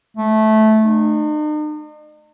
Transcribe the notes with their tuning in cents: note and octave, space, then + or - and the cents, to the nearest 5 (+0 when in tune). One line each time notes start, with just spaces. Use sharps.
A3 -15
D#4 -45